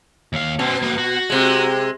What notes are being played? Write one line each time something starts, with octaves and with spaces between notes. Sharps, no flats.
D#2 F5
B2 C#4 C5
A#3 B3
F#4
C3 G#3